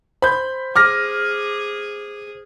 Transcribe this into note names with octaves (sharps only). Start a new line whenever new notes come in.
C5 B5 G6
G#4 D6 F6 A#6